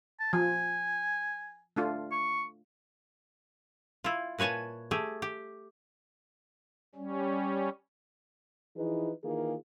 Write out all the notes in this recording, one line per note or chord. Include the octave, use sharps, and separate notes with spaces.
A5
F3 G#5
A3 D4 F4
C#6
E4 F4
A#2 B4 C#5 G#5 A5
A3 G4 G#4
G4
G3 C#4
E3 F3 D#4 E4 G#4 B4
D#3 E3 A#3 F4 G#4